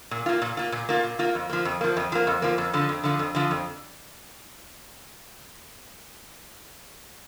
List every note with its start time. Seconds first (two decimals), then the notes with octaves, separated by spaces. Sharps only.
0.11 A#2
0.26 A#3 F4
0.42 A#2
0.57 A#3 F4
0.72 A#2
0.89 A#3 F4
1.03 A#2
1.19 A#3 F4
1.35 F2
1.49 F3 A#3
1.65 F2
1.81 F3 A#3
1.97 F2
2.12 F3 A#3
2.27 F2
2.42 F3 A#3
2.58 F2
2.73 D3 F3
2.89 F2
3.04 D3 F3
3.19 F2
3.35 D3 F3
3.51 F2